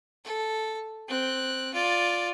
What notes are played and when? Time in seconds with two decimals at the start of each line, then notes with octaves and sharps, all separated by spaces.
0.25 A4
1.08 C4 F#6
1.74 F4 D5